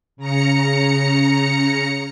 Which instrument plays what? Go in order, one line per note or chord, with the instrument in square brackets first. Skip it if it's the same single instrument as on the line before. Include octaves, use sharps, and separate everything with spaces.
[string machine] C#3 A#5 C#7